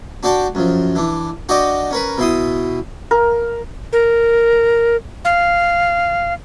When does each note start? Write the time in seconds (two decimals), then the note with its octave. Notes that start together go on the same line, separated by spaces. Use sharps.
0.23 D4 F#4 D5 G5 A5
0.55 F#2 F3
0.95 E3 D4
1.49 D4 F#4 D5 D#5 G5
1.91 C#4 A#4 B4
2.18 B2 E4 C6 D#6
3.11 A#4
3.93 A#4
5.25 F5